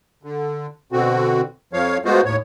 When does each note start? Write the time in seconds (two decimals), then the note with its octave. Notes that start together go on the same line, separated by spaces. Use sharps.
0.23 D3
0.92 B2 D3 C4 F#4
1.73 F2 F3 C#5 F5
2.05 G#3 A3 B3 F4 F#4 C5
2.25 D#2 A2 C#5